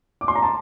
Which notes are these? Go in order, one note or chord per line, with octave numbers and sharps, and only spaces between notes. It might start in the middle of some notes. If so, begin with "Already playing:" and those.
D6
C6
A#5
A5